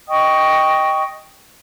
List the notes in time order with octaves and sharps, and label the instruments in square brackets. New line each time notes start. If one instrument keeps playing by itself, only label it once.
[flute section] D#5 G5 C#6 D#6